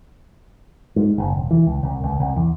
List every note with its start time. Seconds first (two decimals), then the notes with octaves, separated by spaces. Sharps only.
0.96 G#2
1.18 F#1
1.37 E1
1.51 E3
1.67 C#2
1.83 C2
2.03 C#2
2.20 C2
2.36 E2